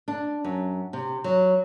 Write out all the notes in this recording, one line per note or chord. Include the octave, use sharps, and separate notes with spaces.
D4
F#2
C3
F#3